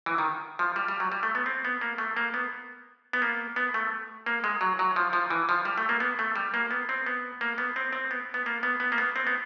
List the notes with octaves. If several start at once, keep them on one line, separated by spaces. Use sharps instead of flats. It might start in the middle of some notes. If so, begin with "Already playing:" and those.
E3
D#3
F3
G3
G3
F#3
G3
A3
B3
C4
B3
A#3
A3
A#3
B3
B3
A#3
B3
A3
A#3
G#3
F#3
F#3
F3
F3
E3
F3
G3
A3
A#3
B3
A3
G3
A#3
B3
C4
B3
A#3
B3
C4
C4
B3
B3
A#3
B3
B3
A#3
B3
C4
B3